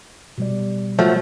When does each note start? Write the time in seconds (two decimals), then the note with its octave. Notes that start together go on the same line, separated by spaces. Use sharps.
0.38 B2 G3 D5
0.99 F3 F#3 A3